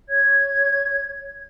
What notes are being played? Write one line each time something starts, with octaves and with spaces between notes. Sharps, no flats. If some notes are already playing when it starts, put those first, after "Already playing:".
C#5 G#6